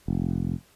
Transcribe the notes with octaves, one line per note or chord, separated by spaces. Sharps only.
F1